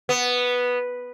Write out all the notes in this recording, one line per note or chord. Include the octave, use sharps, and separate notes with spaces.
B3